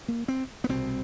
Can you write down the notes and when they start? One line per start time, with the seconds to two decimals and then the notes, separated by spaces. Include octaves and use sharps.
0.08 A#3
0.28 C4
0.64 B3
0.69 C2 B2 C4